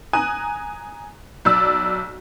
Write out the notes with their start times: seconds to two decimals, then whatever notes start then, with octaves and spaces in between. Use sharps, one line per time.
0.13 G#5 A#5 D#6 F#6 D#7
1.45 B1 D5 E6